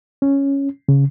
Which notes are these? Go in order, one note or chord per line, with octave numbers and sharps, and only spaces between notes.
C#4
C#3